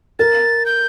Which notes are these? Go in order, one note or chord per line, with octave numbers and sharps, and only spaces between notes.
A#4 A6
G6